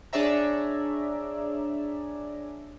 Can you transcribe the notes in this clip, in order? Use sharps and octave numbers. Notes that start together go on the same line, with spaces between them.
D4 G#4 C#5 D5 E5 A#5